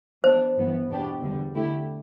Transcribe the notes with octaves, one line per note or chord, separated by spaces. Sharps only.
E3 B3 D4 C5
G2 E3 B3
E2 B2 B3 D4 G4
E2 D3 G3
D3 A3 E4 G4